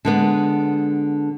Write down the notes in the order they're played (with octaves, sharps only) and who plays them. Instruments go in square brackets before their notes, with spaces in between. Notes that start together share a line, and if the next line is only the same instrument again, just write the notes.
[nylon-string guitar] D3 G#3 B3